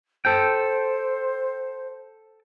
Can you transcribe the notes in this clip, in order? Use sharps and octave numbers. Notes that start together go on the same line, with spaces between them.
A4 C5 G5